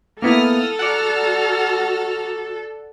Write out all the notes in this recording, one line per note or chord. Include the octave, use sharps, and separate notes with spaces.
A#3 B3 E4 A4 D#6 F6
F#4 D5 F#5 A5 A#5 F6